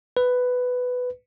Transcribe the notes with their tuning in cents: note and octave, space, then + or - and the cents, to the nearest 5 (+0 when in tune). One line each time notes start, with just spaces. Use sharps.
B4 +10